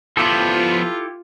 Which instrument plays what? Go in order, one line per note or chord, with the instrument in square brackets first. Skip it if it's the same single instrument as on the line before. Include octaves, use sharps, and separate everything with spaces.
[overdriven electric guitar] F3 B3 [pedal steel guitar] E4 G4 A4 [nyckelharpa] F4